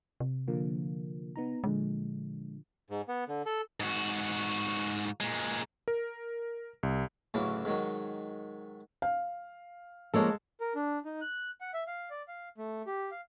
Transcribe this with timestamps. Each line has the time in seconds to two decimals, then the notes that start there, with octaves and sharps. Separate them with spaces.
0.20 C3
0.48 D3 F3 A#3
1.36 B3 D#4 A#5
1.64 A#2 D3 F3 G#3
2.90 G#2
3.08 B3
3.28 D3
3.46 A4
3.80 G#2 F#4
5.20 A#2 G#3
5.88 A#4
6.83 C2
7.34 A1 D2 C#3 E3 F#3
7.65 G#2 D#3 F#3
9.02 F5
10.14 F3 G#3 A#3 A4 C#5
10.61 A#4
10.75 D4
11.05 D#4
11.21 F#6
11.61 F#5
11.74 E5
11.87 F5
12.11 D5
12.28 F5
12.58 A3
12.87 G4
13.11 F5